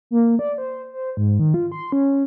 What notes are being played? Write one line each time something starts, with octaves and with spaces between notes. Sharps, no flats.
A#3
D5
C5
C5
G#2
D#3
F4
C6
C#4